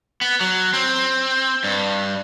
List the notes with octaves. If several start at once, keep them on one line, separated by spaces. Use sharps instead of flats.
B3
F#3
C4
G2